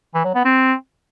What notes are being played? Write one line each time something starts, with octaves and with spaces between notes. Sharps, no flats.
E3
F#3
B3
C4